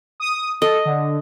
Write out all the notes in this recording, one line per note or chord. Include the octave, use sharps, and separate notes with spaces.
D#6
A4 D#5
D3